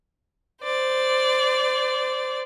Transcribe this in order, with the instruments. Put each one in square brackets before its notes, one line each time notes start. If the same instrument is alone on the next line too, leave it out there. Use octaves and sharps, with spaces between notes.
[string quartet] C5 D5